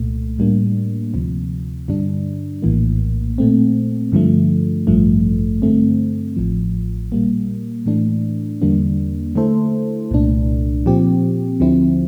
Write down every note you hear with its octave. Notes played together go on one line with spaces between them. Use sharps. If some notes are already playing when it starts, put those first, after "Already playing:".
Already playing: C2 A#2 A3
A2 G3 A#3 D4
D2 C3 F3
G2 D3 G3 D4
A#1 A2 E3 A#3
A#2 A3 C4
G2 D3 F3 A3
A1 G2 F3 A3
G2 D3 A3 C4
A1 A2 F3
A#2 G3 A#3
A2 E3 A3 D4
E2 D3 G3 A#3 D4
D3 A3 E4 A4 C5
C2 A#2 A3 D4
A#2 F3 C4 G4
D2 D3 F3 C4 E4